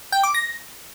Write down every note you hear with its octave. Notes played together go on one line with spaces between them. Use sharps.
G5
D6
A#6